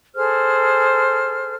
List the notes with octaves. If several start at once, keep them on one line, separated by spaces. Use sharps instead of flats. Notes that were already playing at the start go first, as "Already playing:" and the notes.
G#4 A4 C5 F6